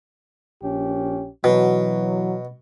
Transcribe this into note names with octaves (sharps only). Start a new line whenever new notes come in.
A#1 C#4 G4
B2 E3 F#3